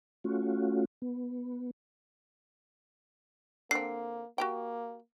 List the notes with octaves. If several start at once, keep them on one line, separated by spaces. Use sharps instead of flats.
A3 C#4 F4 F#4
B3
D3 A#3 C4 C7
A#3 F#4 G4 G5